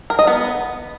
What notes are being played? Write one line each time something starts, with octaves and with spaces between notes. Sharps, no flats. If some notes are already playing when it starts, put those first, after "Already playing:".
A#4
D#5
B3